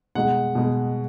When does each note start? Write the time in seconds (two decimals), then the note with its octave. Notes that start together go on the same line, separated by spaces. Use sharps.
0.15 B2 G#3 F#5
0.55 B2 G#3